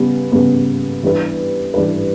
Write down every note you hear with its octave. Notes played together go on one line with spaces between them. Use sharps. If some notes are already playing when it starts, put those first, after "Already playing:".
Already playing: C#3 G3 B3
C#3 G3 B3
E3 G3 D4 G4 B4
E3 G3 D4 G4 B4